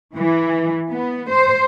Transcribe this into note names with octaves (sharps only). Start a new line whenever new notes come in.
E3
B3
C5